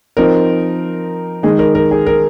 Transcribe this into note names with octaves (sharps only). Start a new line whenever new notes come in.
F3 C4 D#4 A#4
D#3 G#3 D#4 G#4
A#4
A#4
G#4
A#4